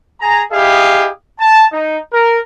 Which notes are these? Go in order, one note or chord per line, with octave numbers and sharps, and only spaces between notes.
G#4 G#5 A#5
E4 G4 G#4 D#5 F5
A5
D#4
A#4